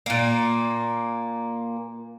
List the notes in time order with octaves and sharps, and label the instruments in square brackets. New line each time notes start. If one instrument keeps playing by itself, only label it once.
[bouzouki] A#2 A#3